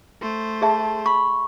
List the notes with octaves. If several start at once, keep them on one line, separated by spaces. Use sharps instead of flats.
A3 C5
G#4 E5 A5
B5 C#6